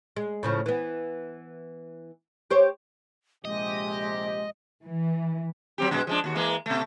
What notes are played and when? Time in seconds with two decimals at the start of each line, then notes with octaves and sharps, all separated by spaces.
0.16 G#3
0.43 A2 C#3 F3
0.66 E3 B3
2.50 G4 C5 C#5
3.45 A#1 C3 G#3 G4 D#5
4.87 E3
5.78 F#3 C4 G4
5.91 F#2 B2 G#3
6.07 F3 G#3 D4
6.24 D#2 F#4
6.35 E3 G#3 A#3
6.66 B2 A3